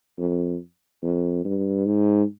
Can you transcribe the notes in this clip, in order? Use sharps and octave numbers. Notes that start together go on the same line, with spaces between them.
F2
F2
G2
G#2